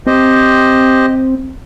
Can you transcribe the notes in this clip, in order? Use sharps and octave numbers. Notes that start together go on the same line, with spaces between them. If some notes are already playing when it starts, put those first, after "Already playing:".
C4 G4 C5 D#5